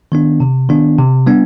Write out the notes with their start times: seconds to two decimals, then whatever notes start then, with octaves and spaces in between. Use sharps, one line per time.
0.12 D#3 B3 D4
0.40 C3
0.69 D#3 B3 D4
0.98 C3
1.27 G3 B3 D4